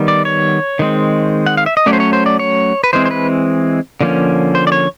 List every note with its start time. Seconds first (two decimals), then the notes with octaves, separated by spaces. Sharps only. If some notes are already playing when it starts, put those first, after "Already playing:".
Already playing: D#3 G3 B3
0.08 D5
0.25 C#5
0.79 D#3 G#3 C4
1.46 F#5
1.57 F5
1.66 E5
1.77 D#5
1.86 F#3 A3 C#4 D5
1.93 C5
2.00 C#5
2.13 C5
2.26 D5
2.39 C#5
2.84 B4
2.93 E3 G#3 C4 C5
3.06 C5
3.11 B4
4.01 D3 F3 A#3 C#4
4.55 C5
4.67 D5
4.72 C#5